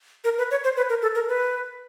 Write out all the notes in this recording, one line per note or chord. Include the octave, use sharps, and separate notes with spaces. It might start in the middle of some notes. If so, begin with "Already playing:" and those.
A#4
B4
C#5
C5
B4
A#4
A4
A#4
B4